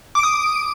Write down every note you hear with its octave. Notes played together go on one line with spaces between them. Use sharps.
D6 D#6 D7